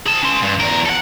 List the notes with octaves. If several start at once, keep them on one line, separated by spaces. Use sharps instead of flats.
G#4 A5
C#4 C6
G2
E2 A#4
A4 F#5